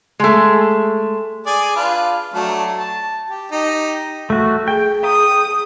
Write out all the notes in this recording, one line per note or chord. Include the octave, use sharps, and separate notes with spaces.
G#3 A3
G#4 D5 G#5
D4 F4 B4
F#3 A3 D4
A5
G4
D#4 G4
A3 F#4
G#4 G5
D#6